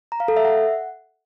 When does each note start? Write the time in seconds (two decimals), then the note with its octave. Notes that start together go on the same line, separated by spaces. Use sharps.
0.12 A#5
0.20 F5
0.28 A4
0.37 E5
0.45 F#5